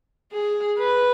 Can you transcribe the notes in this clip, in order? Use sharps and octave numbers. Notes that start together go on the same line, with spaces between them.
G#4
B4